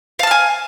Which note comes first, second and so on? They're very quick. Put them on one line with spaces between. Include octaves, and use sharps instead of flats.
F5 A5 F6 G#5